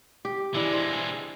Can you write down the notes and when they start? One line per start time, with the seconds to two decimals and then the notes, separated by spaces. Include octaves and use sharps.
0.25 G4
0.55 E3 G#3 D4 E4
0.73 C5